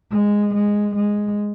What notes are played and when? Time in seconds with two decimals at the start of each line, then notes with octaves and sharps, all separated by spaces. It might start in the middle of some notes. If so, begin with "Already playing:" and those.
0.12 G#3
0.54 G#3
0.95 G#3